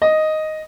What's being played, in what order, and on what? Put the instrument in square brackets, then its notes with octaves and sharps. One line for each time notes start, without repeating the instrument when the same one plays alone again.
[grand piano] D#5